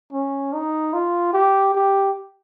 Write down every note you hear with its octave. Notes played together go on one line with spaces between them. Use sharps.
C#4
D#4
F4
G4
G4